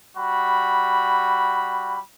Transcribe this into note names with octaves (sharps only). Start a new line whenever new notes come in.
G3 F#4 B5